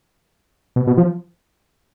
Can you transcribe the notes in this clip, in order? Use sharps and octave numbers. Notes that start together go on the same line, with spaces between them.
B2
B2
F3